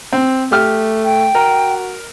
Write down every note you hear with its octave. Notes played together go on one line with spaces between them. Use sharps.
C4
A3 G4 F6
G5
F#4 A#4